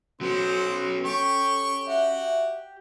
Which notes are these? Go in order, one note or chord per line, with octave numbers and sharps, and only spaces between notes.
F#3 B3 C#4 F#4 C5
G4 A4 C#6
F#4 E5